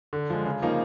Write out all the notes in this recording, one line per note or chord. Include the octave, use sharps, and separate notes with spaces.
D3
F3 G#3
C#3
F3 A#3 D#4